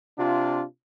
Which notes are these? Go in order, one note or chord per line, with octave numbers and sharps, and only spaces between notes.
C3 D4 F4